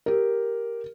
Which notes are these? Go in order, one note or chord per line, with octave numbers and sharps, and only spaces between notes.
G4 A#4